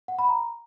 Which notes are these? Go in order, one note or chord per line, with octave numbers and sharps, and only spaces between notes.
F#5
B5
A#5